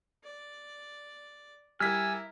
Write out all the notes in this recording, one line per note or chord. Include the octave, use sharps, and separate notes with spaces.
D5
G3 E4 A#4 E5 G#5 E6 F6 B6